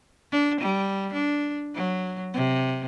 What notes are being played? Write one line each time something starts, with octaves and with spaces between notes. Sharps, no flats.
D4
G3
D4
F#3
C3